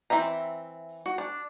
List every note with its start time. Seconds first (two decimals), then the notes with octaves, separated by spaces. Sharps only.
0.10 E3 C4 E5 A#5
1.06 F#4
1.18 D4